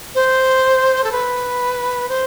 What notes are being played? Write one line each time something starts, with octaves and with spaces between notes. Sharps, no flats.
C5
A4
B4
C5